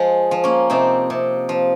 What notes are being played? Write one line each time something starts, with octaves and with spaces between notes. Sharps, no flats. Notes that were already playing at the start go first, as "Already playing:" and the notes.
Already playing: F3 G#3
F3
A#3 C#4
C3 C4 D#4
C3
F3